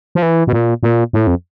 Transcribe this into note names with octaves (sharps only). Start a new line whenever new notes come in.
F3
E3
B2
A#2
A#2
A2
F2